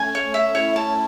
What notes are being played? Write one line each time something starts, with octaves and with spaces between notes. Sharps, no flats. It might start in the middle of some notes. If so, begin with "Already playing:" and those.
Already playing: A3 C#4 G#5
C#5
E5
C#4 E4 C#5
A5